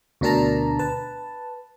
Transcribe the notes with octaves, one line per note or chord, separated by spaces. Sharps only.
D2 B2 D4 A#4 A5 A#5
B4 A5